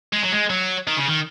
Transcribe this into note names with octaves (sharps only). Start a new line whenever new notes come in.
G#3
F#3
G#3
F#3
D#3
C#3
D#3